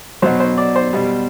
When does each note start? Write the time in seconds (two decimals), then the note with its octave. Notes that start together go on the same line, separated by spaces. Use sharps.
0.22 B2 F#3 C5
0.40 C5
0.58 D5
0.76 C5
0.93 B2 G3